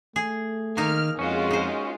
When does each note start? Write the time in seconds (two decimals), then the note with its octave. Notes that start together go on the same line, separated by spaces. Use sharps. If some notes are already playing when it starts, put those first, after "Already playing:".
0.16 A3 G#4
0.77 D#3 A#3 D#4 F6
1.19 F2 G#3 C#4 F4 F#4
1.51 D#4 C5